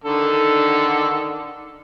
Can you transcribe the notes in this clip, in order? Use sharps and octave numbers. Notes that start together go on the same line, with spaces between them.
D3 D#3 A4